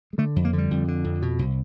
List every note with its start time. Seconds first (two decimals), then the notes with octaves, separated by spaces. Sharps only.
0.13 G#3
0.18 D3 A3
0.36 F2
0.45 A#3
0.53 D3 G3
0.71 F2
0.88 D3
1.04 F2
1.22 B2
1.39 C2